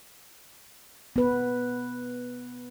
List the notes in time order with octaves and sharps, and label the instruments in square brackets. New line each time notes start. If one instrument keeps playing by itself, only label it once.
[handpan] B3 B4